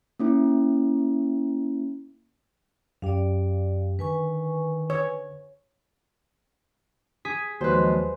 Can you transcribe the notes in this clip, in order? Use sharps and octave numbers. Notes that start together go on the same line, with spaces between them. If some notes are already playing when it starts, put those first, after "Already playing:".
A#3 C#4 E4
F#2 G4 D5 F5
D3 D#3 B4 G#5 C#6
C#5
G#4 B6
D#2 F3 F#3 G#3 B4 C5